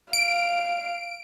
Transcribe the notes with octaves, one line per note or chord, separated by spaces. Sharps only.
F5 D7